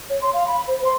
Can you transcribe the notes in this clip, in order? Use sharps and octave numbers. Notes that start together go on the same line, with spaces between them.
C#5
C6
F5
B5
C5
C6